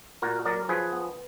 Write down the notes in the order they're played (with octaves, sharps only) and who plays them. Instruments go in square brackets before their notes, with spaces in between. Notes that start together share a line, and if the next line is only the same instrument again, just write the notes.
[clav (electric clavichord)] A#2 F#4 A#4
F#3 A#4 D5
F3 G#4 B4
B3